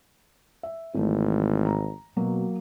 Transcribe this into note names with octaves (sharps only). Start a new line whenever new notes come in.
E5
G#1 E3 A3
A#5
B2 F#3 A#3